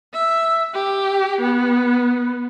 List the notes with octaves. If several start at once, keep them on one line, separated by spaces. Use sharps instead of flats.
E5
G4
B3